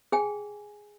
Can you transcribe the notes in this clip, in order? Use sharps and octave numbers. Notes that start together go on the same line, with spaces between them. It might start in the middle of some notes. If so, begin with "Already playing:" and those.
G#4 G5 G#5